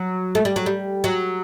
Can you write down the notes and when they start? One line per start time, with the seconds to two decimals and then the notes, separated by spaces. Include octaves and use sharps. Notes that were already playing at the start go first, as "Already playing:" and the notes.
Already playing: F#3
0.35 A3
0.45 G3
0.56 F#3
0.66 G3
1.04 F#3